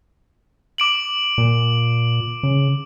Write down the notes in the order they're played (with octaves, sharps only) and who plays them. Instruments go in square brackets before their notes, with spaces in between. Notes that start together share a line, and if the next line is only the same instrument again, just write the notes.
[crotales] D6 D7 F#7
[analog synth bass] A#2
C#3